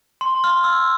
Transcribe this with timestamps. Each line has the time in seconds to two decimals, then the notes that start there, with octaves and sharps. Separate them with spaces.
0.21 C6
0.44 F6
0.64 E6